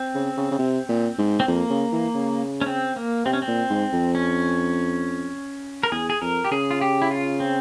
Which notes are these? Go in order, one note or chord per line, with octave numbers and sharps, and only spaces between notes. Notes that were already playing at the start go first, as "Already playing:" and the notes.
Already playing: C4
C#3
C#3
C#3
C3
A#2
G#2
C4
F2 A#3
C#3
E3
C#3
C#4
C4
A#3
C3 C4
C#4
C4
A#2
G#2
F2
C#4
A#4
E2 G#4
G#4
F2 A#4
G4
C#3 G#4
F4
G4
E4
F4
C4